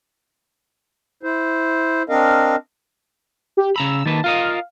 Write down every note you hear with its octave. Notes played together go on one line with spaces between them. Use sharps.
E4 C5
C4 D4 A#4 D#5 F5
G4
C#3 A#5 B5 E6
D#3 A#3 B4 A5
F4 A#4 D#5 F5